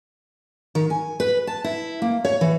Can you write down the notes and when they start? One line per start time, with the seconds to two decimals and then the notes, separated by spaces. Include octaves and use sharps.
0.75 D#3
0.90 G#5
1.20 B4
1.47 A5
1.64 E4
2.02 A#3
2.25 C#5
2.41 E3